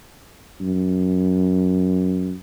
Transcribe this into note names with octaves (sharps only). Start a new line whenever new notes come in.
F#2